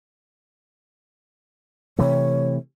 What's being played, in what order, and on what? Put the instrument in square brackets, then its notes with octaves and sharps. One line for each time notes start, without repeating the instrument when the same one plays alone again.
[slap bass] C3 E3 A3 [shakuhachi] C#5